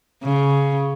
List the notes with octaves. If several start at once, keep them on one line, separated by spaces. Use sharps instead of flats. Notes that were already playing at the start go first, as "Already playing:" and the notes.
C#3